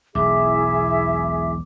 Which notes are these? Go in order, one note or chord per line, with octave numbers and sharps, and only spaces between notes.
E1 B1 E4 G#4 E5 D6